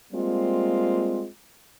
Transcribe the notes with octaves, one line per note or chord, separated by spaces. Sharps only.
G3 G#3 A#3 C4 F4